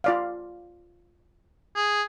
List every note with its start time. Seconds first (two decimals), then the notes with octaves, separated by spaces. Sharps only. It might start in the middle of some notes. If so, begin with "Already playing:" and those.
0.04 F4 D5 F5
1.76 G#4